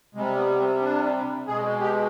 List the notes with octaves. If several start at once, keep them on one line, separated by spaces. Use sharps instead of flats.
C3 G3 G#3
B3
C4
D4
B2 G#3 G#4
G4